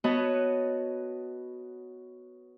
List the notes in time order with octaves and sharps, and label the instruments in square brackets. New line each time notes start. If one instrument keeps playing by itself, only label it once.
[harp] B3 F#4 B4 C#5 D#5 A5